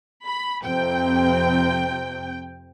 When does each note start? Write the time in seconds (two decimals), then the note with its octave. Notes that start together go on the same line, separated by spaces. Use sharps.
0.25 B5
0.63 F2 C3 C4 G5